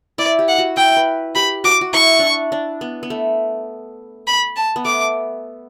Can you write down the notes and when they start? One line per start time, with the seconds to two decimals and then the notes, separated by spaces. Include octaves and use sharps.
0.18 E4 D5
0.39 G4
0.48 F#5
0.58 F#4
0.77 E4 G5
0.96 B4
1.35 G4 B5
1.64 F#4 D6
1.81 F#4
1.94 E4 C#6
2.19 D4 E4
2.52 D4
2.81 B3
3.03 B3
3.10 A3
4.27 B5
4.56 A5
4.76 B3
4.85 A3 D6